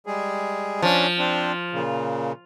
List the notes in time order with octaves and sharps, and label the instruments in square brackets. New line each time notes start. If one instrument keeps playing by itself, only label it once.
[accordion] G3 G#3 G#4
[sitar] F3 [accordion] C#4 D4
[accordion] C4 D4
A#2 C#3